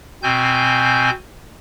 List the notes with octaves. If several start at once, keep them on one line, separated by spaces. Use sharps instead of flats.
B2 C4 G#5 G6